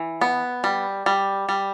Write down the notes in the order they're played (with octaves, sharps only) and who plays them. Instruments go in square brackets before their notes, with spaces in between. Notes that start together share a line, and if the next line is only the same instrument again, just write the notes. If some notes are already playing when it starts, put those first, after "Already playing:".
Already playing: [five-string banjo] E3
B3
G3
G3
G3